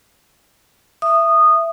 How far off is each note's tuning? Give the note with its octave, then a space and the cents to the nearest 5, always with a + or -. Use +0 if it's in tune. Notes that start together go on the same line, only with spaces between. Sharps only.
E5 +15 D#6 -15